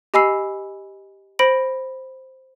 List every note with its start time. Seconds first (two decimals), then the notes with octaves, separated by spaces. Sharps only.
0.14 G4 D#5 G#5 B5 E6 C7
1.39 C5 B5 A#6 D7 F#7